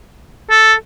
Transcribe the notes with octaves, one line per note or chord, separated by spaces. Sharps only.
A4